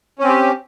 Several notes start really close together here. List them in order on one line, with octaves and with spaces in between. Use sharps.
C#4 C4 G4